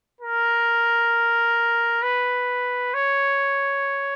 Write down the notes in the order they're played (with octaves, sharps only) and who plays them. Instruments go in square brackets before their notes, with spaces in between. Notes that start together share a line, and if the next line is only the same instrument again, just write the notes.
[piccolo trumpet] A#4
B4
C#5